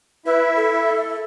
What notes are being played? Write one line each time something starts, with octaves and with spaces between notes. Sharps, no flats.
E4 B4 E5
A4